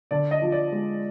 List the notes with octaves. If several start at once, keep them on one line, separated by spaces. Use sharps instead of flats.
D3 D5
D#5
F3
D5
G#3